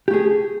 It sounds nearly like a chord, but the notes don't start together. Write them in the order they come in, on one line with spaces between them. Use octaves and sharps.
G4 A3 G#4